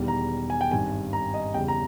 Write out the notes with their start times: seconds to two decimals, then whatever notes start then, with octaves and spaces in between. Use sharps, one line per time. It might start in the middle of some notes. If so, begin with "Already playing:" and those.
Already playing: E1 E2 D#3 G3
0.08 A#5
0.50 G#5
0.61 G5
0.71 G#1 G2 D#3 G#5
1.13 A#5
1.34 D#5
1.54 E2 C#3 G3 G5
1.68 A#5